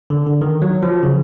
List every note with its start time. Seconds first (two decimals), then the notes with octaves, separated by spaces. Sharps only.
0.10 D3
0.27 D3
0.41 D#3
0.62 F#3
0.83 F3
1.03 C#3